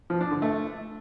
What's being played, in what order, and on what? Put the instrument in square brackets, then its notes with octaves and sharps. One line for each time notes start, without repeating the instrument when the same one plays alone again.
[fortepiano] F3
D4
D3
A3